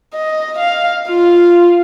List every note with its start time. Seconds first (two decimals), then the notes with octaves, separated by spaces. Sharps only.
0.14 D#5
0.59 F5
1.08 F4